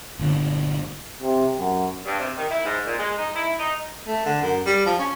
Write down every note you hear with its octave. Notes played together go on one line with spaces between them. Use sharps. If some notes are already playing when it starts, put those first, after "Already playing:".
G1 A#2 D3
C3
F#2
G2
C3
D#3
E4
G#2
A#2
G#3
D#4
E4
D#4
A3
D3
F#2
G3
F3
C#4